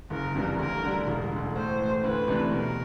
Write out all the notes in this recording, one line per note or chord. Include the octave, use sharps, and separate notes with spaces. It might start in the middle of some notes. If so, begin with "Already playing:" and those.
F#1 A#4
F2 C3 E3 G3
D2 A#4
D3 G3
E1
D2 D3
A2 C5
E3 A3
D2 B4
C3 E3 A3 D4
B2 A#4